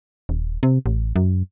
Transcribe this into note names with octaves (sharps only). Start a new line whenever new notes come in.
D#1
C3
A1
F#2